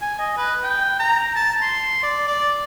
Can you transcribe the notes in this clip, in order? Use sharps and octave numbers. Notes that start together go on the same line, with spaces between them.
G#5
D#5
B4
G5
A#5
A5
C6
D5
D5